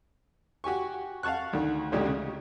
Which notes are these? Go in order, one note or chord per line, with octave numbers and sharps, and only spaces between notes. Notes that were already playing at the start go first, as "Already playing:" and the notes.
F#4 G4 G#5 C#6
F5 F#5 A5 C#6 F#6
D2 D#3
A1 D2 A#2 G#3 D#4 G4
C#3